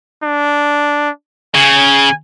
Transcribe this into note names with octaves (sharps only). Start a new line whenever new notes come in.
D4
C#3 G#5